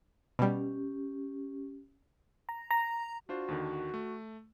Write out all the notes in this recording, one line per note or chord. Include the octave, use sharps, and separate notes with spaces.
B2 G3 C#4 G4
A#5
A#5
D4 F4 F#4 C5
D#2 D3 D#3
A3